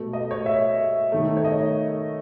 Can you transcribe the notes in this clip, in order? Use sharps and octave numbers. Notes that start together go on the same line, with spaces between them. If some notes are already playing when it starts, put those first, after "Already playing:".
Already playing: B2 A3
D#5
C#5
E5
D#3 A3
C#5
D#5